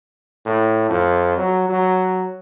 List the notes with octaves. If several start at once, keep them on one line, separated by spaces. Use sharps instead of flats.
A2
F2
F#3
F#3